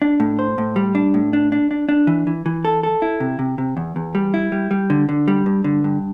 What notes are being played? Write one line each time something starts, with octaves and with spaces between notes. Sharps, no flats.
D4
A2
C5
A2
G3
D4
A2
D4
D4
D4
D4
E3
E3
E3
A4
A4
E4
C3
C3
C3
E2
E2
G3
E4
G3
G3
D3
D3
G3
G2
D3
G2